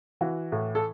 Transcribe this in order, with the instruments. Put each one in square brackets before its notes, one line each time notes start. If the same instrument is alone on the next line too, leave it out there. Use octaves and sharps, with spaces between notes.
[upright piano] E3 F#4
A2
A4